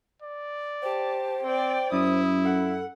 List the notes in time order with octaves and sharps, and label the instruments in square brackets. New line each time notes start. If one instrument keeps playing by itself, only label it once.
[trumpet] D5
[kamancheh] G4 A5 [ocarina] C5
[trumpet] C4 [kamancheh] D5 G5
[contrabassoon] F#2 [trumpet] E4 [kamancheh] D#6
[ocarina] A4 [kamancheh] F#5